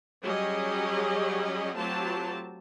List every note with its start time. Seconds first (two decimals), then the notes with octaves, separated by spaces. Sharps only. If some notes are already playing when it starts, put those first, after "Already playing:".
0.23 F#3 G3 C#4 G4 G#4 D#5
1.76 F#3 A3 C4 F4 G4 A5